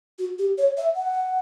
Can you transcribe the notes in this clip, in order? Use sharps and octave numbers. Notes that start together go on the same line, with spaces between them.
F#4
G4
C#5
E5
F#5